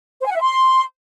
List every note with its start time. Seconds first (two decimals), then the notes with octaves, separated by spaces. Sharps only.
0.21 C5
0.26 G#5
0.31 F#5
0.36 E5
0.41 C6